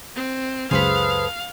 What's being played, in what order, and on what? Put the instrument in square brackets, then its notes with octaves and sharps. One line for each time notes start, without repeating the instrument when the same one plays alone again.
[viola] C4
[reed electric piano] C#2 F#2 C5 [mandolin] G#4 A4 B4 [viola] F5